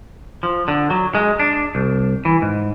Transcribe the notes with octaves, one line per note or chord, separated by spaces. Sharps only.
F3
D3
F#3
G#3
D4
C2
E3
G#2